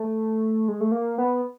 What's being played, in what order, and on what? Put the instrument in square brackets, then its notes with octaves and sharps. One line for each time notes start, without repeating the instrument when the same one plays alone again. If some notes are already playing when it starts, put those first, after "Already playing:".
Already playing: [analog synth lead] A3
G#3
A3
A#3
B3